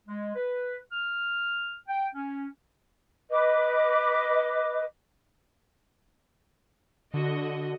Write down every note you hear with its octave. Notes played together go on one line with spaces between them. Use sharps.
G#3
B4
F6
G5
C#4
B4 D#5 D6
D3 F#4 D#5